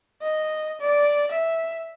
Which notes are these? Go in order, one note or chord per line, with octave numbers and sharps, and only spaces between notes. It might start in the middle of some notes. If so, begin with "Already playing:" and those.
D#5
D5
E5